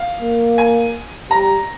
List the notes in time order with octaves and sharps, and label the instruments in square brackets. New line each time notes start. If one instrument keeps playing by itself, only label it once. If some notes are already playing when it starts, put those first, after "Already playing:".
Already playing: [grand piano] F5
[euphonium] A#3
[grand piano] G#5
[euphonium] G3 [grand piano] A#5